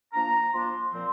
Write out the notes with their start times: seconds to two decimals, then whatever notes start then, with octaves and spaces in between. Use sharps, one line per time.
0.13 F3 A#3 D4 A#5
0.52 F3 A#3 D4 C6
0.92 A#2 F3 C4